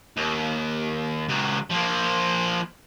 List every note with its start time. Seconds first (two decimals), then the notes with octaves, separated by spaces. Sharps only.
0.17 D#2
1.28 C#2 F#3
1.70 F3 A#3